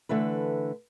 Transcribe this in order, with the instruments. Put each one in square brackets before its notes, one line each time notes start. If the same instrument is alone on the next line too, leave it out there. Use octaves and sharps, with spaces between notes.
[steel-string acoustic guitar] D3 E3 A3 B4